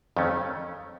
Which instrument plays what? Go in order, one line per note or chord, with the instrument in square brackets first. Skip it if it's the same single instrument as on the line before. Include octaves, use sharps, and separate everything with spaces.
[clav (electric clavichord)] F2 D#3 A3 C#4